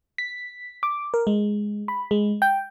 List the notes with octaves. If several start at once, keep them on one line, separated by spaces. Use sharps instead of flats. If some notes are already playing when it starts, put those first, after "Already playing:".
B6
D6
A#4
G#3
B5
G#3
G5